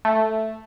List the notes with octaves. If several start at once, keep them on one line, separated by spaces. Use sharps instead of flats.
A3